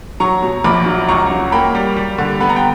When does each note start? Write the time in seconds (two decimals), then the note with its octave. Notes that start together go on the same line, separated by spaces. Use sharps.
0.20 F#3 A#5 C#6
0.42 B2
0.64 A#1 B5 D6
0.86 F#3
1.08 C#2 A#5 C#6
1.31 F#3
1.52 A#3 G5 B5
1.75 G3
1.97 G3
2.18 D3
2.40 B3 B5
2.49 A#5
2.56 G5